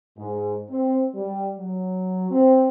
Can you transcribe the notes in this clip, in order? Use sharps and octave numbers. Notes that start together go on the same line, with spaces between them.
G#2
C4
G3
F#3
C4